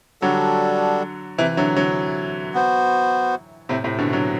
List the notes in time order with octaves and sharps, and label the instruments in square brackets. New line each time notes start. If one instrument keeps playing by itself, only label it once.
[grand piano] D3 F#3 [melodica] G3 D4 F#4 A4
[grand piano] C3 E3
D3 F#3
D3 F#3
[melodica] B3 F#4 C5
[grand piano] A2 C3
A2 C3
B2 D3
D3 F#3